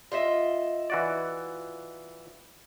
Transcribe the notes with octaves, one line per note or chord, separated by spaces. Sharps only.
F4 D#5 E5
E3 F#4 D5